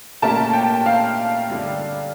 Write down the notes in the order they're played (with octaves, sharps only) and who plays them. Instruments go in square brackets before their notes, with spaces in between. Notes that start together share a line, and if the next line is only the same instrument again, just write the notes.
[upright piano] A#2 A3 C#4 G4 A#4 [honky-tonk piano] A5
[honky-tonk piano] G5
F5
[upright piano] G2 D3 G3